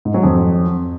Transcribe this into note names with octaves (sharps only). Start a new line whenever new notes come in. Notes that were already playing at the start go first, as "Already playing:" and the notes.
G#2
F#3
F2